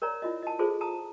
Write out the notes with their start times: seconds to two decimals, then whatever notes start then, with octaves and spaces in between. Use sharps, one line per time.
0.02 A#4 C#5 D5 A#5
0.22 E4 F4 D#5
0.43 D#5 A5
0.59 F4 G#4 A4 C5
0.81 A5 A#5 D#6